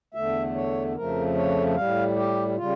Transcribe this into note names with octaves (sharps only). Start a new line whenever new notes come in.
E2 D3 A3 E5
C#5
F2 C#3 F3 A3 A#4
C#5
A2 G3 F5
G4
C#3 G3 F4